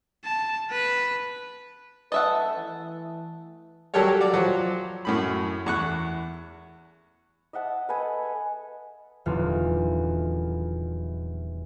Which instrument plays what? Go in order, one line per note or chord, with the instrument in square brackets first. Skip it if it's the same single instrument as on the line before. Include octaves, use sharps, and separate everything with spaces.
[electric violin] A5
B4
[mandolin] A3 A5 [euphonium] B4 [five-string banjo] D#5 E5 F#5
[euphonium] E3
[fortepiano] F#3 G3 G4 A4 A#4 C#5
F#4 D5
F3 F#3
F#2 A2 B5
E2 C#6 F#6
[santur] D#5 E5 F#5 A5
A4 B4 D#5 G#5
[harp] D#1 E2 D3 F#3 F4